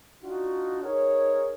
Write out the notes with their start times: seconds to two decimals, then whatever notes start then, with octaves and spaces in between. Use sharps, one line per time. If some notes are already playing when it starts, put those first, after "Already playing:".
0.23 D4 D#4 F4 F#4
0.84 D#4 G#4 A#4 C#5